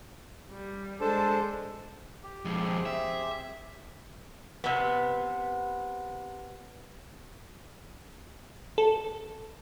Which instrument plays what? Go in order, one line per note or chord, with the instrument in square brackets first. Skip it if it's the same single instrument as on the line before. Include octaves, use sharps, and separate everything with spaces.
[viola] G3
[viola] G#3 A4 [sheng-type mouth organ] D4 C5 A5
[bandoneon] G4
[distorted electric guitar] F2 G#3
[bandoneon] C4 G4 G#4
[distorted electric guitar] E5
[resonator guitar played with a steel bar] C3 B3
[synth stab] A4